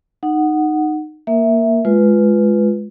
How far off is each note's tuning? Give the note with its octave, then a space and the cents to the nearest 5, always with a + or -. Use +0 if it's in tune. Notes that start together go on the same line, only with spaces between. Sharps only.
D#4 -15 F#5 +0
A#3 +0 A#4 +0 E5 +0
G#3 +15 F4 +0 B4 +0